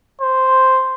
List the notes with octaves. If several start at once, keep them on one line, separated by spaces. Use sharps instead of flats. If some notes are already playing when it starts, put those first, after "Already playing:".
C5